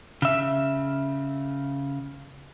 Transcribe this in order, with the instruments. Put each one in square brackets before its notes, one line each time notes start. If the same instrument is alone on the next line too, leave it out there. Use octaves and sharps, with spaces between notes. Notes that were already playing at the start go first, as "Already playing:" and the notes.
[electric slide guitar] C#3 E5